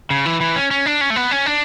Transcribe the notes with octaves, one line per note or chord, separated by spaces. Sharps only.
C#3
E3
E3
C#4
C#4
D4
C#4
A3
B3
C#4
D4